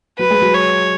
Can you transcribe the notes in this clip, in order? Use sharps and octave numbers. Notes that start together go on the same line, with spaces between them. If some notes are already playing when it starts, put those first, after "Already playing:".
F#3 B4
G#3
F#3
C#5